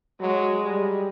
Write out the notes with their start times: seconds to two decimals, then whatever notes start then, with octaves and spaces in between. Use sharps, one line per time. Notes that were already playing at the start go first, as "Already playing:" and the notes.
0.21 F#3 G#3
0.64 G3